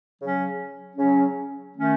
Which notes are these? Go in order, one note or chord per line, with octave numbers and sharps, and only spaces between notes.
C#3 F#3 C#4
C#3 F#3 C#4
D#3 A3 C#4